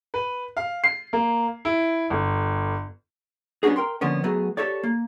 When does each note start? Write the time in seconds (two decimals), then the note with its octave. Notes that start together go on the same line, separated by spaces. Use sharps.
0.14 B4
0.57 F5
0.84 C7
1.13 A#3
1.65 E4
2.10 G1
3.63 G3 B3 C#4 D4 F#4 G#4
3.76 A#4 G5 C6
4.01 D3 F3 A#3 B3 C#4
4.23 F#3 A3 B3 F#4 G#4
4.57 G4 A4 C#5 D5
4.83 A#3